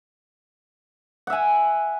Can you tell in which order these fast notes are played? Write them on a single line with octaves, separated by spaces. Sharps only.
F#5 E5 G#5